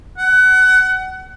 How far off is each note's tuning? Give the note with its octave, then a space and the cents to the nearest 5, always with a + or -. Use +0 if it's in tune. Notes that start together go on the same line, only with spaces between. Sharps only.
F#5 +25